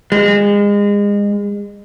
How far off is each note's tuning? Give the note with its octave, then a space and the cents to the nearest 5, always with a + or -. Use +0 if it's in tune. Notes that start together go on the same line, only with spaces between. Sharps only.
G#3 -30